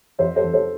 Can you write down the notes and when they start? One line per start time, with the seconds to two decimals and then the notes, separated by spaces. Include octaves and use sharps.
0.19 F2 C5 E5
0.36 A4 C5
0.44 F2
0.53 A4 C5